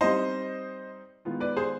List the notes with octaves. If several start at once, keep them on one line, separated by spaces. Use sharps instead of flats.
G3 C4 D#4 C5 D#5
D#3 G#3 B3 F4
B4 D5
G#4 C5